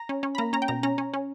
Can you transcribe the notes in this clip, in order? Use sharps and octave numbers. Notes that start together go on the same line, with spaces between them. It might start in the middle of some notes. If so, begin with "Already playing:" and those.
Already playing: A#5
C#4
C#4
B5
A#3 A#5
C#4 A#5
G5
B2 A#5
C#4 A#5
C#4
C#4